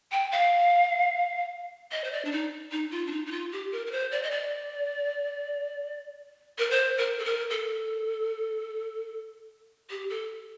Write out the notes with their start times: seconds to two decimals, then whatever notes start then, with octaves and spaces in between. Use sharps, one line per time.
0.12 G5
0.32 F5
1.92 D#5
2.04 C5
2.12 D5
2.25 D4
2.32 D#4
2.71 D#4
2.91 F4
3.07 D4
3.11 D#4
3.26 D#4
3.31 F4
3.52 G4
3.72 A#4
3.86 A#4
3.91 C5
4.11 D5
4.23 D#5
4.31 D5
6.58 A#4
6.70 C5
6.98 A#4
7.19 A4
7.24 A#4
7.50 A4
9.90 G4
10.10 A4